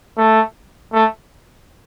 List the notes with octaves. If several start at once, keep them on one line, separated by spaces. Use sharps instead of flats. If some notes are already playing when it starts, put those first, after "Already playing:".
A3
A3